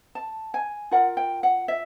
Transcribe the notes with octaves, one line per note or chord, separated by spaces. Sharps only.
A5
G#5
F4 A#4 F#5
G5
F#5
E5